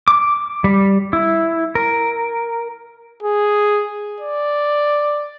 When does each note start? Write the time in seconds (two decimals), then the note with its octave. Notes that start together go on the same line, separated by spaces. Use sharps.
0.08 D6
0.64 G3
1.13 E4
1.75 A#4
3.23 G#4
4.20 D5